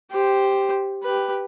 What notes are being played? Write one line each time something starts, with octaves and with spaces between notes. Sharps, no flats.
G4 C5
G4 B4